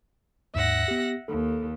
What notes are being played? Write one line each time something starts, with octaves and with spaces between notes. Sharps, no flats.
D#2 G#2 E5 F#5 A#6
B3 G4
D#2 A4